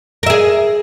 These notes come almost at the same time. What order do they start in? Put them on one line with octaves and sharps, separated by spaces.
A#4 E5 G#4